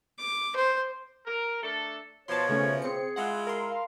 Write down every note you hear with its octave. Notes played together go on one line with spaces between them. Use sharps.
D6
C5
A#4
A3 D4 A4
B2 F3 C#5 A5 C6
C#3 A3 C#4
C4 G#4 C#7
G#3 E4 F4 F#5
A#4 C6
F5